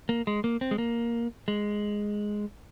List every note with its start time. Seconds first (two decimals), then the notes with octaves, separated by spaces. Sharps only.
0.09 A#3
0.27 G#3
0.44 A#3
0.61 C4
0.71 G#3
0.78 A#3
1.48 G#3